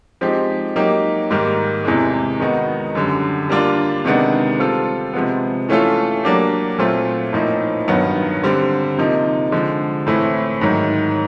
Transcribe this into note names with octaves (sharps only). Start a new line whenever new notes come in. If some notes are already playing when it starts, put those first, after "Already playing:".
F3 G#3 C4 D#4 G4
F#3 A#3 D#4 G4
G#2 D#3 G3 A#3
E2 C3 E3 G#3
D#3 G#3 B3 D#4 F#4
F#2 D3 G3
G3 A#3 D4 F4
C3 D#3 G#3 B3 D4
G3 C4 F4 A4
C3 F3 G#3 B3
E3 A3 C#4 F4 A4
F#3 A#3 D4 G4
A#2 F#3 A3 C4 F4
A2 F3 A#3 D#4
G2 D#3 F#3 B3
D3 G3 C4
C3 F3 A#3 D#4
D3 F3 G#3
A2 E3 A3 C4 E4
G#2 D#3 F#3